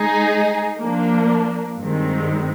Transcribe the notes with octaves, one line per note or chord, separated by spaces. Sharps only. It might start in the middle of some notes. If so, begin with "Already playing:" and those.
Already playing: G#3 D#4 G#4
F3 A#3 D4
G2 D#3 G#3 C4